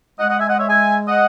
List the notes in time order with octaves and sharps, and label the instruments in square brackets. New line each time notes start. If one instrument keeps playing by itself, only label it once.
[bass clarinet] G#3 [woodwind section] D#5 F#5
[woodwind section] D#5 F#5
E5 G#5
D#5 F#5
C#5 E5
E5 G#5
D#5 F#5